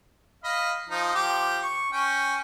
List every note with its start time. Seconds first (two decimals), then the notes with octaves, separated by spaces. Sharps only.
0.44 D#5 F5 B5
0.89 F3 D#4
1.15 F3 G4
1.62 C#6
1.92 C#4 G5